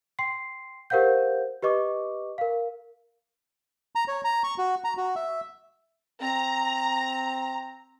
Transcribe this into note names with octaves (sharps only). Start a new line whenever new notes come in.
G5 C6 C7
G4 A#4 C5 F5 F#5 G6
G4 B4 D#5 C#6 D6
A#4 F5
A#5
C#5
A#5
C#6
F#4
A#5
F#4
E5
C4 A#5